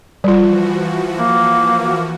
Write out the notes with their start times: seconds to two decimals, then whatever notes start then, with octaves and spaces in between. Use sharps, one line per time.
0.24 E3 F3 G3 F4 F#4
1.19 A#3